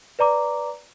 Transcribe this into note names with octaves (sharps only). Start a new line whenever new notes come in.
B4 D5 A#5 D6